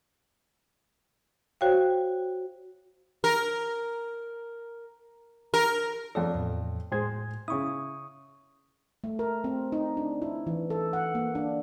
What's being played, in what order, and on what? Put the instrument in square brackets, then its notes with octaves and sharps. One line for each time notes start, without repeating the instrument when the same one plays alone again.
[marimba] F#4 C5 C#5 F5 G5
[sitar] A#4
A#4
[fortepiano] F2 A4 [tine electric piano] C#5 D5
[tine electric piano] E2 A2
[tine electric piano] A2 G#6 [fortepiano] G#3 G#4 C5
[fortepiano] C#3 E4 [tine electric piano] C#6 D#6
[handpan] A3
A#4
C4
D#4
D4
E4
E3
A4
F#5
A#3
D4